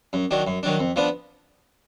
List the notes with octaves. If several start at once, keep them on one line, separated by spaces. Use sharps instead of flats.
F#2
D#3 F#3 D4
F#2
D#3 F#3 D4
F2
F3 B3 D4